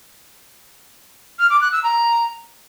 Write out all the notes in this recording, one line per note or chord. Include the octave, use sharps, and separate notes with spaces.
F6
D6
F#6
E6
A#5